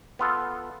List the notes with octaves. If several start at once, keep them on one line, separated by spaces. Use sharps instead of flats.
B3 F4 A4